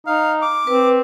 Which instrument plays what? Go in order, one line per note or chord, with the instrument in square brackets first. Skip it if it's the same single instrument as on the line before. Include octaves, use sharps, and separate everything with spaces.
[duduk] D#4 [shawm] F5
[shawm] D6
[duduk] C4 [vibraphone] B4